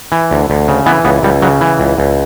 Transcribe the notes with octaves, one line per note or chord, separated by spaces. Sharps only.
E3
D2
D2
C#3
E3 B3
C#2 B3
C#2 G3
C#3 F#3
E3
C#2
C#2